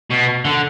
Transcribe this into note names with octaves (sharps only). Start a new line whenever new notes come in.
B2
D3